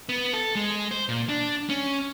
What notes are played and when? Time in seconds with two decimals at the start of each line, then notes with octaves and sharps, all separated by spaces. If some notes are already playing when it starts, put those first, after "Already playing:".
0.09 B3
0.34 A4
0.55 G#3
0.91 C5
1.09 A#2
1.29 D4
1.69 C#4